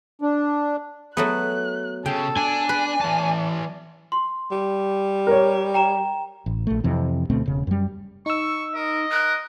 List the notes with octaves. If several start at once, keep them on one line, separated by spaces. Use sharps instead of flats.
D4
F#3 A3 B3 F#6
C#3 A4 G5
D4 G#5
B4 D5
E3 A5
C6
G3
A#4 C#5
G5 A#5 E7
A1
A#1 A3
F2 C3 E3
D2 B2 A3 C4
E1 C#3
F#2 G3
D#4 C#6 E6
A#4 D#5
A#4 F#6